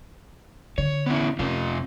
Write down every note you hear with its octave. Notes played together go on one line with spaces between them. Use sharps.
D3 C#5
B3 C#4 E4
F2 C3 C#4 F4